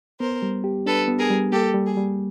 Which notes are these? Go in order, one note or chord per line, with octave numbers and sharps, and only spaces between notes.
B3 A#4 C5
G3
G4
D4 A4 B4
B3
G#4 A#4
G3
A#3 G4 A4
G3
G#4
G3